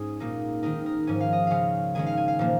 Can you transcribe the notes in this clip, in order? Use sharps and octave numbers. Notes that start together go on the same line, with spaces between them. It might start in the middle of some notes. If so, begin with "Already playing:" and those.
Already playing: G#2 G#3 C#4 G#4 G#5
A#2 A#3 D#4
D#3 G#3 D#4 A#4
A#4
G#2 F3 C#4 G#5
F5
D#5
C#3 G#3 C#4 F5
D#3 G#3 C#4 G#5
F5
G#5
F5
A#2 F3 A#3